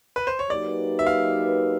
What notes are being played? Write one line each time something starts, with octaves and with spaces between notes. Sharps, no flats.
B4
C5
C#5
F#3 A#3 D#4 G4 B4 D5
E5
F5